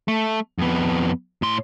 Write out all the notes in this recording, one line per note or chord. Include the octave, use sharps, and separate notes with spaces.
A3
F2 B3
A2 C6